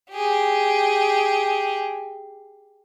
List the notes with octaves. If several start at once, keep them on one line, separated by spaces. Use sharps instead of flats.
G4 G#4